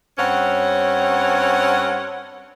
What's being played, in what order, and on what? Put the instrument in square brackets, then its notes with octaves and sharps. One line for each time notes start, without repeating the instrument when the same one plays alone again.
[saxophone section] G2 C4 C#4 C#5 F#5